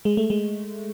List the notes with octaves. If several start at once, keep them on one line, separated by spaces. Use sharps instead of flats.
G#3
A3
G#3